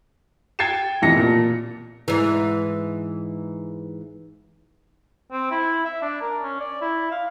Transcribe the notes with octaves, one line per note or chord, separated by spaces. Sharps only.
G5 G#6 A6 C7 C#7 E7
F1 B2 E3 A5 A#6 C#7
A#2
G#2 E3
C4
E4
E5
D4
A#4
C#4
D5
E4
F5